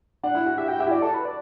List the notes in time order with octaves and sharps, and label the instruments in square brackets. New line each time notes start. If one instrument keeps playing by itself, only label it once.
[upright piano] D4 [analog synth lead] F#5
[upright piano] E4
F#4
[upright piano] G4 [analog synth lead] E5
[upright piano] F#4 [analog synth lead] G5
[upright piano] G4 [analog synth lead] E5
[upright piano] E4
[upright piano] F#4 [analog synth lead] D5
[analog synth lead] A4
B4
D5